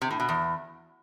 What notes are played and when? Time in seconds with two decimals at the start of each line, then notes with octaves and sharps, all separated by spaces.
0.02 C3
0.11 A2
0.20 B2
0.29 E2